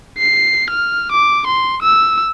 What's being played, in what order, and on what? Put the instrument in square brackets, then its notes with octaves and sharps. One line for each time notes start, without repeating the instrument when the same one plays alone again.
[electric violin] C7
F6
D6
C6
E6